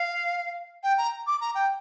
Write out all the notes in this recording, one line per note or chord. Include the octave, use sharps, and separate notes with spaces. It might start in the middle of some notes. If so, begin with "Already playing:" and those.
Already playing: F5
G5
A#5
D6
A#5
G5